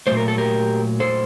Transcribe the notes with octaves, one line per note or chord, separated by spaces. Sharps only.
A#2 F#3 A3 C5
A#4
A4
G4 A#4
A4 C5